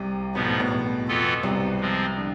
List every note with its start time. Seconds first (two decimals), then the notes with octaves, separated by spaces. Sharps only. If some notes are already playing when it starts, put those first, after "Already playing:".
Already playing: C2 C3
0.35 G#2 B2 F3 B3
0.47 A2
0.60 B2
0.71 B2
1.08 F2 E3 B3 F4 A4
1.43 C2 C3
1.80 F3 G#3 C4
2.17 D3